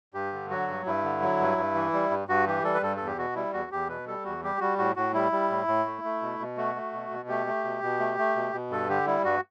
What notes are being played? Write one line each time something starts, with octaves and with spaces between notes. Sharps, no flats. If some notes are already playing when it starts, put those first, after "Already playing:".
G2 G4
D3
F#3 F#4
G2
G2 E4
D3
F#3
G2
G2
E3
G3
G2
G2 F#4
E3 G4
G3 A4
B4
G2 A4
E2 A4
G4
B2 F#4
G3 E4
E2 F#4
E2 G4
B2 B4
G3 A4
E2 F#4
G3 G4
G3 F#4
A2 F#4
A2 F#4
G3 E4
G3
A2
A2
A3
A3
B2
B2
A3 F#4
A3
B2
B2
A3 G4
A3
B2
B2
A3
A3
B2
B2
G2 A4
D3 G4
G3 E4
G2 F#4